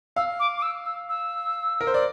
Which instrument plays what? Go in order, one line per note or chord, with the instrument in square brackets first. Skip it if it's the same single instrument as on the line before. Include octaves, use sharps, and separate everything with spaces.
[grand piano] F5 [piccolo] E6
[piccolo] D6
D6
E6
E6
E6
[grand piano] A#4
C5
D5